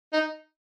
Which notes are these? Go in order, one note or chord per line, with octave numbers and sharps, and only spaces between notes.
D#4